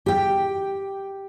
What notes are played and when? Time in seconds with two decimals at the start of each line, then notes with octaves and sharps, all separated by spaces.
0.06 G4 G5